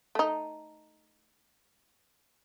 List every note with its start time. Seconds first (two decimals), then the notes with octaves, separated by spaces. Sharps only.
0.15 A3 D#4